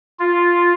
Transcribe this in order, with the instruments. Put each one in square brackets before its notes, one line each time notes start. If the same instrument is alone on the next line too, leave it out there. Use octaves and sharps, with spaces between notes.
[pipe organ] F4